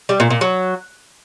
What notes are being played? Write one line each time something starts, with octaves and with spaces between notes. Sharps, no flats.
G3
A#2
A#2
F#3